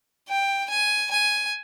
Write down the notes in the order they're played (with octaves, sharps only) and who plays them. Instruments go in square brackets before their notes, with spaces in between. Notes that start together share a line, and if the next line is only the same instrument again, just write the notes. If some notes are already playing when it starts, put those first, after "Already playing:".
[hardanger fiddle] G5
G#5
G#5